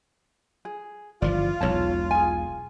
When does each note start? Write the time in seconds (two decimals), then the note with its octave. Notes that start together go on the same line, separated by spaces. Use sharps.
0.65 G#4
1.22 G1 E3 F3 F4 D5
1.61 E1 B1 E2 C#5 A5
2.11 G#4 G#5